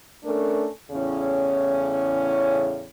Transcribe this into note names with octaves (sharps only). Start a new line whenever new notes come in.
A3 C#4 D4 A4 A#4
E2 A2 C#3 C#4